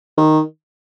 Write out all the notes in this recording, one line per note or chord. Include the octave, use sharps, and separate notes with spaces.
D#3